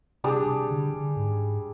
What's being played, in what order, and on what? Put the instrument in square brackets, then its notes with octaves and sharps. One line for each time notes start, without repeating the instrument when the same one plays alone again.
[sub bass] C3 [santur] G3 D4 G#4
[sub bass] C3
D3
D3
G#2